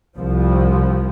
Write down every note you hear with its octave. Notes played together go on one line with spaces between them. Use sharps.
C2 F3